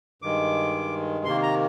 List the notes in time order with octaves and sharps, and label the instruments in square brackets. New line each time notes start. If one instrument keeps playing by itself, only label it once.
[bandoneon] G2 D#3 G#3 D6
C3 D#3 A#3 C6
A#5